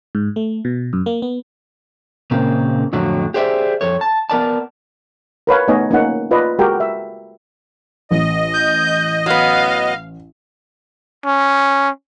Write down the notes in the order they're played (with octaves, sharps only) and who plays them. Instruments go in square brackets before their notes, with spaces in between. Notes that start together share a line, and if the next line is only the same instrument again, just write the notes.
[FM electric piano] G#2
A3
B2
F#2
A#3
B3
[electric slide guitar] A#2 C#3 A#3 C4
F2 A2 D3 F#3
G4 G#4 C5 D5 E5
F2 A4 C#5
A5
B3 A#4 D5 A5
[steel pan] A#4 B4 C#5 F5
A3 B3 D#4 C#5 D#5 G#5
A#3 C#4 D#4 F#5
F4 B4 D5 D#5
G#3 F#4 G4 A#4 G5
E5
[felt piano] A1 [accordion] D#5
[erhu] G6
[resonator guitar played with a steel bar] F#3 B3 [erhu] F5
[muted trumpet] C#4